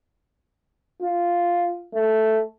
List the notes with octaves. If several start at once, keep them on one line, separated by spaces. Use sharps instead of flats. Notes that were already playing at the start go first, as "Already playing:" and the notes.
F4
A3